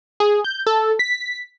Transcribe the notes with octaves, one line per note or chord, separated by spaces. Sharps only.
G#4
G6
A4
B6